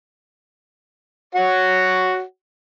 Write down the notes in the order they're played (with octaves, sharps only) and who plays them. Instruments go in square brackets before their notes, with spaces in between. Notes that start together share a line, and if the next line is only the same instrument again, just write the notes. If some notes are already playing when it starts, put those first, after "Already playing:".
[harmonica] F#4 C#5 F#5